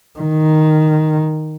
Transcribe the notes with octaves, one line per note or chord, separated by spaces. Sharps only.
D#3